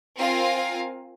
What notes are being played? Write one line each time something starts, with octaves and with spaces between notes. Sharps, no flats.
C4 F4 A#4 F5 G#5